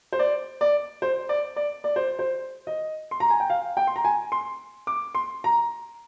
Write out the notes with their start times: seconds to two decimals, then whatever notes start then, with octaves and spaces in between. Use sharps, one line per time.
0.12 C5
0.19 D5
0.61 D5
1.02 C5
1.29 D5
1.56 D5
1.84 D5
1.96 C5
2.19 C5
2.67 D#5
3.11 C6
3.20 A#5
3.30 G#5
3.40 G5
3.50 F5
3.77 G5
3.87 C6
3.96 A#5
4.05 G#5
4.32 C6
4.87 D6
5.15 C6
5.44 A#5